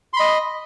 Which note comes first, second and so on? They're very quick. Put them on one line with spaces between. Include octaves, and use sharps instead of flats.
C6 B5 D#5